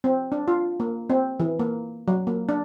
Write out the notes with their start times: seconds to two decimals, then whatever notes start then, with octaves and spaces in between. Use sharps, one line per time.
0.04 C4
0.32 D4
0.48 F4
0.80 A#3
1.10 C4
1.40 E3
1.59 A#3
2.08 F#3
2.27 A#3
2.49 D4